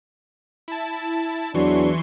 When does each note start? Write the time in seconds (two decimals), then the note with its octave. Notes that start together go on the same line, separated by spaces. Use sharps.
0.68 E4 A5
1.54 E2 E3 F#3 D4 C6 C#6